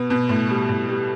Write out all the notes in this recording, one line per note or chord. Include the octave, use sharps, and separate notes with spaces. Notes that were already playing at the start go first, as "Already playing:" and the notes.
Already playing: B2 B3
B2
A2
G3
A2
G3